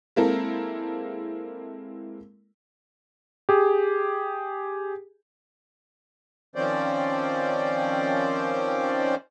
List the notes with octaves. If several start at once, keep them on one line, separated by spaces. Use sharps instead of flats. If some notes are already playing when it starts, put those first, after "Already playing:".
G#3 A#3 C4 E4 A4 A#4
G4 G#4
D#3 F3 C4 C#4 C5 D5